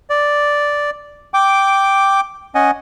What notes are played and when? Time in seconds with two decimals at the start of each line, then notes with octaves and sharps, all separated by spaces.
0.10 D5
1.34 G5 D6
2.55 C#4 D#5 F#5 G#5